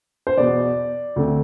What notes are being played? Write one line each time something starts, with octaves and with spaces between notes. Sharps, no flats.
C5
E2 B2 B3 D5
D2 D3 A3 C4